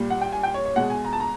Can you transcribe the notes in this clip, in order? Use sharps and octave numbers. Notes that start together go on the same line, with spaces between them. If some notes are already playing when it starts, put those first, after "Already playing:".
Already playing: A#2 G3
F#5
G5
G#5
G5
C#5
C#5
B2 G#3 F#5
G#5
A#5
A5
A#5